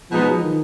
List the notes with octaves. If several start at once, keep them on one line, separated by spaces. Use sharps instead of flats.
B2 F3 G#3 B3 D#4
F#3
F3
D#3